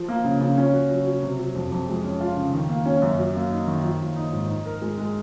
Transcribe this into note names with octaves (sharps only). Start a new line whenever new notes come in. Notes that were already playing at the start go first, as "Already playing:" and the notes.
Already playing: F3
A#3
C#3
C#3
C#4
F#4
F#3
F#3
C3
F#3
F2
F2
G#3
C#4
F4
C#3
D#3
A#3
C#4
F#2
F#3
A#3
D#4
D#3
F3
A#3
D#4
G#2
D#4
A#4
G#3
G#3